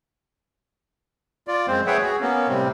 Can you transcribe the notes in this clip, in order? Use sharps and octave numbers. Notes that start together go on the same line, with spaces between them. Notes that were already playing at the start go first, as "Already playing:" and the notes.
F4 D5
F#2 G#3 C4 C5
G#4 B4 C#5 E5 F#5 G5
F#4 G#4
A#3 B3 C#4
A2 C3 G3 C4